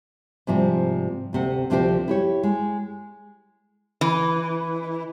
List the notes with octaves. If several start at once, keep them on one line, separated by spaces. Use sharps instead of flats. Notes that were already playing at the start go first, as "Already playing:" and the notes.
G#2 C3 F3 G3
D2 C3 F#5
D2 C3 F3 G4 G#4 C5
E4 G4 C#5
G#3
E3